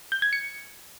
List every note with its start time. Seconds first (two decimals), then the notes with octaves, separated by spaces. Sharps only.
0.12 G6
0.22 G#6
0.33 C#7